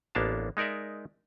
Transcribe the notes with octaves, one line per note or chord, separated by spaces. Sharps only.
A1 A#3 B3 D4 F5 A5
G#3 D#4 A#4 D5 E5